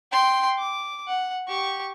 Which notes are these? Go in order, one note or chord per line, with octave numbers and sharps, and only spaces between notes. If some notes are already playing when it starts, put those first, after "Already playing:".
G5 C6
D6
F#5
G4 C#6